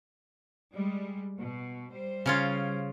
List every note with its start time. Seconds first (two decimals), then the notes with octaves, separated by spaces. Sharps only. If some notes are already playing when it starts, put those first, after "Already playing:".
0.71 G3 G#3
1.40 B2
1.92 G3 C5
2.26 C#3 C#4 F4